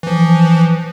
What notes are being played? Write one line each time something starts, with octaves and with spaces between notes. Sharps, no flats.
E3 F3